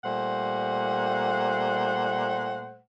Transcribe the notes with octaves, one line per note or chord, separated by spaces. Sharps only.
A#2 G3 A3 C5 F#5